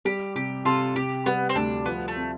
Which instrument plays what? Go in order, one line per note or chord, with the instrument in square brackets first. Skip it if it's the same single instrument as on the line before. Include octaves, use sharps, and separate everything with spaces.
[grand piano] G3 [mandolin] G4
[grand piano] C3 [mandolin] G4
[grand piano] C3 [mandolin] F4 A4
[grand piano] C3 [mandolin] G4
[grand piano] G3 [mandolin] B3
[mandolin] C4
[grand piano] D2 [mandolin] D4
[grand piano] F3 [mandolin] B3
[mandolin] A3
[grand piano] C4